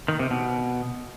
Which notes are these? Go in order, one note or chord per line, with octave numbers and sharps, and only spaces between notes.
D#3
C3
B2